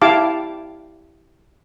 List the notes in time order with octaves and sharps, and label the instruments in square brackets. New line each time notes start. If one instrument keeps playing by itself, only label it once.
[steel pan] E4 G4 F5 A5 D6